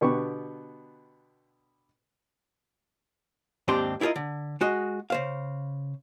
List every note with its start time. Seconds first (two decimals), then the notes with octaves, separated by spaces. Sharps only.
0.01 B2 D3 B3 G4 C#6
3.68 D#2 G#2 C4 D4 G4 C6
4.01 E4 F4 G#4 A#4 D#5
4.16 D3
4.61 G#3 F#4 D#5
5.10 C#3 C5 F5